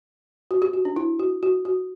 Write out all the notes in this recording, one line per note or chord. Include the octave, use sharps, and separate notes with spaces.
F#4
G4
F#4
D4
E4
F#4
F#4
F#4